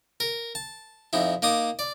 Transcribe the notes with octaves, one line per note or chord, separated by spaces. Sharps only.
A#4
A5
F2 D#4 E4
A#3 D#4 D6 D#6
D5